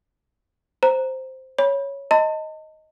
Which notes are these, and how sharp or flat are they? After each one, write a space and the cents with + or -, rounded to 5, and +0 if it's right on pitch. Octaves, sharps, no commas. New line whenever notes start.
C5 +0 A#5 +0
C#5 +0 B5 -25
D#5 +5 A5 +35 C6 -15